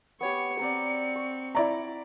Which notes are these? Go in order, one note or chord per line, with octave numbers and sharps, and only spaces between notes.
B3 G4 C#5 C#7
C4 D5 F#5 A#5
C#6
E4 D5 A#5